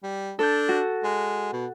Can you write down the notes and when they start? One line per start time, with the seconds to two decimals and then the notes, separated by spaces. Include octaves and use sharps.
0.03 G3
0.39 D4 A4 G6
0.69 F#4
1.04 G#3
1.53 B2